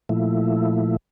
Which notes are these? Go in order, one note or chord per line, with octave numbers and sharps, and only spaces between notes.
A#2 F3 A3 E4